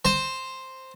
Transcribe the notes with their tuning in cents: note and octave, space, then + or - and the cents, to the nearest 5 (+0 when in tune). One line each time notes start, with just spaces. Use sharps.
C5 +0 A#5 -30